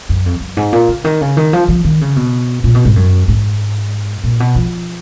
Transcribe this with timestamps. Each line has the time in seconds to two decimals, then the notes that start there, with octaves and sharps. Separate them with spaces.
0.09 F#2
0.26 F2
0.41 F#2
0.57 G#2
0.72 A#2
0.88 C#3
1.04 D#3
1.21 C#3
1.37 D#3
1.53 F3
1.69 F3
1.85 D#3
2.01 C#3
2.16 B2
2.64 A#2
2.74 B2
2.85 G#2
2.96 F#2
3.28 G#2
4.24 A#2
4.40 B2
4.55 F3